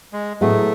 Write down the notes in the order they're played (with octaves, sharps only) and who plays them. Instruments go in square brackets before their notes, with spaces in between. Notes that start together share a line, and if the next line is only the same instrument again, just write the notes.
[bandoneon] G#3
[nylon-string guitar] A2 F#3 B3 E4 G#4 [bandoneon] A3